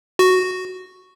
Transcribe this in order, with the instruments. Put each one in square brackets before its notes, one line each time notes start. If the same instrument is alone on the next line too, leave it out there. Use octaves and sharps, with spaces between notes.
[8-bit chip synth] F#4